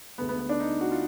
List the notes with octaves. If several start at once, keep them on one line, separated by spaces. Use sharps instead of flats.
D2 D3 G#3 B3
B3
B3
D4
D#4
F#4
F4